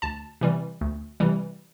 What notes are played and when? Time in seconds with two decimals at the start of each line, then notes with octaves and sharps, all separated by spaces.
0.02 D2 A5
0.41 C3 E3 G3
0.81 D2
1.20 C3 E3 G3